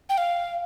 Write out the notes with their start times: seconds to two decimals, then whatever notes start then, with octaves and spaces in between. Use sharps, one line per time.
0.09 G5
0.18 F5